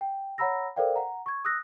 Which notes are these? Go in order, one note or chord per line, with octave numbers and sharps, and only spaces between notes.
G5
C#5 F#5 A#5 B5 E6 A#6
A4 A#4 C5 D5 F5 G5
F#5 A#5
C#6 G#6
D#6 E6 F#6 A#6